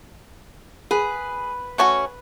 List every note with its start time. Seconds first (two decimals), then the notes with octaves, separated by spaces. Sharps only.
0.91 G#4 B4
1.78 A3 C#4 F#4 F#5 G#5 C#6